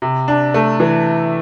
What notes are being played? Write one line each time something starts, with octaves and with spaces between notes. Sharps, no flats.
C3
D4
A3
E3